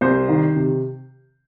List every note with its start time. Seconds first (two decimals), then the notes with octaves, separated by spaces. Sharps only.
0.01 C2 C5
0.28 D#3
0.56 C3